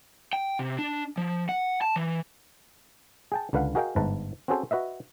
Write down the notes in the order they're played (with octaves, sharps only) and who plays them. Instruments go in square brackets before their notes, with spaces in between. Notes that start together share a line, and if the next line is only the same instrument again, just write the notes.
[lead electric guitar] G5
C3
D4
F3
F#5
A5
E3
[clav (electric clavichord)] G#4 G5 A5
C#2 D3 B4 F5 F#5
F#4 G#4 A#4 D#5 F5 G5
G1 G#2 B4 A5 A#5
C4 C#4 F#4 G#4 A4 C5
F#4 B4 D#5 E5